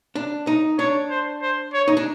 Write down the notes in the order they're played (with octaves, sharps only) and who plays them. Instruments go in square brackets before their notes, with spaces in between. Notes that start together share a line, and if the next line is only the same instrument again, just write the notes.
[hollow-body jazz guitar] D4
D#4
[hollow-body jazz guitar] D4 [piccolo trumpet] C#5
[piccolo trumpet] C5
C5
C#5
[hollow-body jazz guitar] D#4
D4